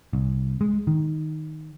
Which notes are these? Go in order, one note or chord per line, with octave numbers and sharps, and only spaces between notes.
C2
G#3
D#3